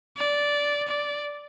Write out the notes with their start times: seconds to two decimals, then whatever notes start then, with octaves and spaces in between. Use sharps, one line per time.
0.17 D5
0.88 D5